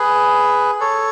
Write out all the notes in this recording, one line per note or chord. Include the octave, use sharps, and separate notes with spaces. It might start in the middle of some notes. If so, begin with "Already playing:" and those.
Already playing: G#4 B4
A4 C#5